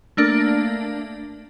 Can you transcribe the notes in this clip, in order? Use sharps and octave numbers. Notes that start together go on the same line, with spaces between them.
A3 A#3 D4